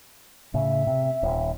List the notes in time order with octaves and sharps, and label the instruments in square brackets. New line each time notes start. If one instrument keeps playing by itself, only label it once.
[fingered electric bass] A2 C#3 [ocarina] E5
[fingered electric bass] C3
D#1